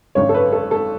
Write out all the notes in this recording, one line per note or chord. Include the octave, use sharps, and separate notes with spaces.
G#1 F#2 D3 C#5
A4
B4
A4
A4